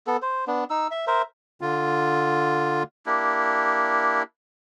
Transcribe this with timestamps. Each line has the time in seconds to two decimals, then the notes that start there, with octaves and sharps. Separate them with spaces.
0.07 B3 A4
0.22 C5
0.47 B3 D4
0.70 D#4 E6
0.91 E5
1.07 A#4 C5 E5
1.61 D3 F4
3.06 A#3 D4 E4 G4